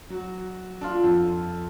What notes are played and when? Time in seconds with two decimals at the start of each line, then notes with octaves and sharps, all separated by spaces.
0.10 F#3 F#4
0.81 D4 F4 A4
1.04 F2